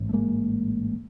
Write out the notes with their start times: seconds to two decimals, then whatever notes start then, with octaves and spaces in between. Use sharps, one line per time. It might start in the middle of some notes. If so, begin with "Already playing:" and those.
Already playing: A1 G#2
0.09 A3
0.13 G#3 A#3